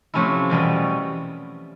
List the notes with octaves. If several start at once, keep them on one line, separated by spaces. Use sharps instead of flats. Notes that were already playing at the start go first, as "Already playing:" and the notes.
C3 F3 A3 C#4 E4
E2 B2 G3 B3